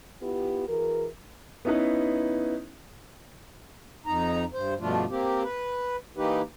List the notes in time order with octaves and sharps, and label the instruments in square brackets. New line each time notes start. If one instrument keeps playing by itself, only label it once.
[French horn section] B3 E4 F4 G4
E3 F#4 G#4 A#4
[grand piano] B3 C#4 D#4 E4 B4
[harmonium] F2 D#4 A#5
G2 C5
G2 B2 F3 A3 D4 F4
A#3 C4 G4
B4
E3 A#3 D#4 G4 B4